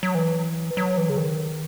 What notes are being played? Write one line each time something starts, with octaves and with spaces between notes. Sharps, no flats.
F#3
E3
F#3
E3
C#3
D#3